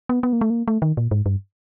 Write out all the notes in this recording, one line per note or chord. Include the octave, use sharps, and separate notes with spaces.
B3
B3
A#3
A3
A#3
A3
D#3
A#2
G#2
G2